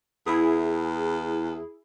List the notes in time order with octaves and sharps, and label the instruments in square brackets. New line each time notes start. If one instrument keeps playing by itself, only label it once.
[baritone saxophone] E2 [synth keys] E4 G#4